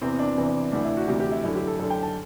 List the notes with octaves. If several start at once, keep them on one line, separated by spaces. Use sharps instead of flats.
E2 C3 E3 C4
D4
E2 C3 E3
D2 C3 E3 D4
E4
F#4
D2 C3 E3 G4
G4
E4
F#2 D3 E4
G4
A4
F#2 D3 A4
G5
A5